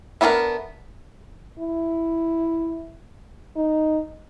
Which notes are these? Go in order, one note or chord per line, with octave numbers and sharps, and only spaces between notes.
A3 B3 D4 G#4 A#4
E4
D#4